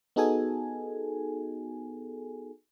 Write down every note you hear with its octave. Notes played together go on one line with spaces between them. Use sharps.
B3 D#4 F#4 G#4 A4 G#5